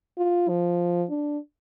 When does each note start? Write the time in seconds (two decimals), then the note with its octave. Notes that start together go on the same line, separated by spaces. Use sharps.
0.18 F4
0.49 F3
1.10 D4